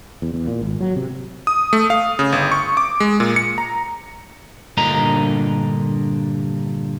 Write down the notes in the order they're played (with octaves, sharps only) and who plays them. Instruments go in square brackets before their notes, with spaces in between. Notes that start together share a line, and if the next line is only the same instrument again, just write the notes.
[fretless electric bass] E2
E2
A#2
G#1
F#3
C3
[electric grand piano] D#6
A3
F5
C#3
G1
C#6
D6
G#3
A#2
C#7
A#5
[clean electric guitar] G2 A#2 D3 A#4 D#5 A#5